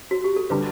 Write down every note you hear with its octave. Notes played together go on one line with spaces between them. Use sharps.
F#4
G4
A4
D3 G3 D4 B4